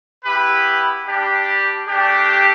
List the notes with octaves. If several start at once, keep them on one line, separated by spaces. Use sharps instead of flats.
B3 E4 G4 B4
G3 D4 G4
A3 D4 G4